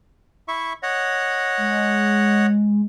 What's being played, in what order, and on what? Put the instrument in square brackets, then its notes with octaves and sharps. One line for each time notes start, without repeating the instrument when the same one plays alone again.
[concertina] E4 E5 C#6
C#5 D#5 F#5
[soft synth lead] G#3